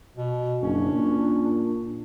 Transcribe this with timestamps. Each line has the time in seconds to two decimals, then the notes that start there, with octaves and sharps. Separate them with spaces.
0.17 B2
0.62 F#1 C#4 D4
0.93 A#2